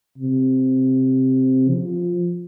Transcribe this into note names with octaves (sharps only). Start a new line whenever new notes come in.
C3
F3